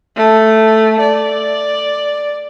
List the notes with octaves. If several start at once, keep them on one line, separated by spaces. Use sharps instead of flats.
A3
D5